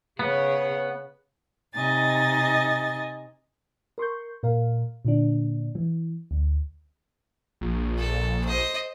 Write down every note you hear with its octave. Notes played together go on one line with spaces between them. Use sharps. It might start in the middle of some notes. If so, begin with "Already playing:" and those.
C#3 B3 C#5
C3 D#4 D#5 G#5 A6
A#4 C6 C#6 G6
A#2 A#4 F5
A#2 D3 D4
E3
D2
A#1
A4
C5 D#5